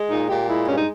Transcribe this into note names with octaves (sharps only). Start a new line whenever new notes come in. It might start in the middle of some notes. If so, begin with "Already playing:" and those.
Already playing: G#3
A#2 D#4
A#2 G4
G#3 E4
G2 C#4
D#4